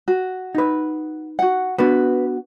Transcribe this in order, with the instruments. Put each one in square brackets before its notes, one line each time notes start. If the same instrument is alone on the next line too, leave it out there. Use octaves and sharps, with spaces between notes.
[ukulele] F#4
[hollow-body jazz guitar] D#4 B4
[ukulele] F#4 F#5
[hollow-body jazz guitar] B3 D4 F#4 [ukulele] B4